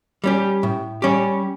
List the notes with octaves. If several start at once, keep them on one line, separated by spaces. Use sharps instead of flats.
G3 C#4 G4
A2
G3 C#4 G4